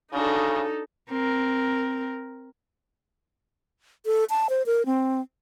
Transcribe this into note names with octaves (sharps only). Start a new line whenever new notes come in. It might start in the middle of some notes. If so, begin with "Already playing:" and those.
C#3 D4 D#4 F#4 A4
C4 A#4
A4
A5
C5
A#4
C4